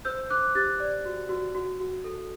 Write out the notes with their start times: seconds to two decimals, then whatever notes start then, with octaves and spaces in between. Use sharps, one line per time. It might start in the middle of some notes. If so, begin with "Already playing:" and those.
0.05 C5 E6 G6
0.30 C5 D6 F#6
0.55 G4 F#6 A6
0.80 D5
1.05 F#4
1.29 F#4
1.55 F#4
1.80 F#4
2.04 A4